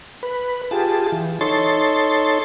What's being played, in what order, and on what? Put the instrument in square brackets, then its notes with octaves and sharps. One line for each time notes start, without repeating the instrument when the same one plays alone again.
[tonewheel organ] B4
F4 G4 G#4 A5
E3
D#4 A4 C#5 C6 A6